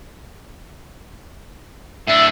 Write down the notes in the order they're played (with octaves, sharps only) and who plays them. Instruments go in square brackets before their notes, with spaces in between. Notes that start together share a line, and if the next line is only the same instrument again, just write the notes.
[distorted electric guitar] A2 D4 [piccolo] E5